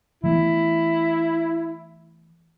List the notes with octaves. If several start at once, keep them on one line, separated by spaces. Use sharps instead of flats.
E3 A3 B3 E4